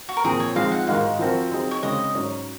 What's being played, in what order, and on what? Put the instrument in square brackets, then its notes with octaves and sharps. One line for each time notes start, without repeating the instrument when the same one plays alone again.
[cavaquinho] F#4
A#4
[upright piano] A#2 F3 C4 [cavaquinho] G#4
[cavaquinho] C#5
[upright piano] F3 G#3 C4 D#4 G#4 [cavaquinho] F5
[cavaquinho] F#5
[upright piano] G#2 D#3 G#3 D#4 F#4 [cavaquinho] F5
[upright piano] F3 C4 F#4 A#4
F#3 C4 D#4 G#4
[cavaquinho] C#5
[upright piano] C#3 G#3 C4 [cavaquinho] D#5
[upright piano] G#2 F#3 C#4